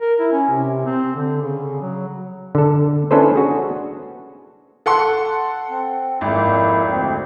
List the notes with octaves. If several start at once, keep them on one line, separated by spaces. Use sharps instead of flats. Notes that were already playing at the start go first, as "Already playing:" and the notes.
A#4
E4
C#4
C3
C4
D3
C#3
F#3
D3 A4
C#4 D4 E4 A4 B4 C5
F#4 G#4
A4 F#5 C6
C4
G#1 F2 A#3 E4
D2 C4